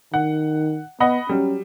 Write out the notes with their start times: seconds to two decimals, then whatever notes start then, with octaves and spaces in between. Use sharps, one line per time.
0.14 D#3 F#5
1.00 B3 D#5 F#5 B5
1.29 F#3 G3 C#4